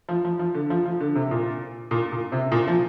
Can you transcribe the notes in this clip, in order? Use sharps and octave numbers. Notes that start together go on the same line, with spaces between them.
F3
F3
F3
D3
F3
F3
D3
C3
A#2
A#2
A#2
C3
A#2
F3